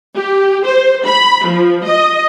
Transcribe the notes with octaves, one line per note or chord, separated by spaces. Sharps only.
G4
C5
B5
F3
D#5